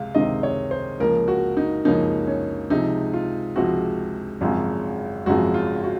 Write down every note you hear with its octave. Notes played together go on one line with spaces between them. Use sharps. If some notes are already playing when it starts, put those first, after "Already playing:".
Already playing: C#2 C3 G#3 F5
C#2 C3 D#3 G#3 C4 D#5
C#5
C5
C#2 C#3 F3 A#3 A#4
F#4
D#4
C#2 C#3 F3 A#3 D#4
C#4
C#2 C3 F3 G#3 C4 D#4
F4
C#2 C3 F3 G#3 C4 F#4
G#1 F#2 C#3 F3 G#3
G#1 F#2 C#3 F3 G#3 F#4
F4
F#4